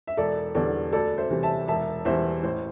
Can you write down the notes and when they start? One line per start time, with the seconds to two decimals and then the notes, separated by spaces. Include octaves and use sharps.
0.07 E5
0.17 E1 A4 D5
0.55 E2 D3 G3 A4 D5
0.92 D2 A4 D5
1.18 C5 E5
1.30 C3 E3 G3
1.43 E5 A5
1.68 E1 E5 A5
2.05 E2 E3 G3 C5 E5
2.43 A1 C5